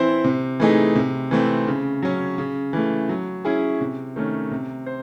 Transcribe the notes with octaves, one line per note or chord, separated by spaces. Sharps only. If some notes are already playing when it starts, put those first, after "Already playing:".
Already playing: E3 C4 E4 C5
C3
E3 A3 D#4 G#4
C3
E3 A3 C4
C#3
F#3 C#4
C#3
E3 A3
F#3
C#4 E4 G#4
C3
D#3 A3 C#4
C3
C5